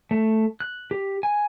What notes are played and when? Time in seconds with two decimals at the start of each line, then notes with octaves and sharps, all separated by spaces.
0.11 A3
0.60 F#6
0.91 G4
1.23 G#5